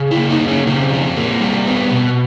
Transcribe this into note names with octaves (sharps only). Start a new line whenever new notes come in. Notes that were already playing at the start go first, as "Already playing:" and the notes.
Already playing: C#3
E4
A#3
D#4
C#3
C#4
C#3 C4
F3
A#3
G3
B3
B2